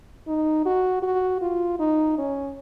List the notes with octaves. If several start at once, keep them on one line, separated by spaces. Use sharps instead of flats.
D#4
F#4
F#4
F4
D#4
C#4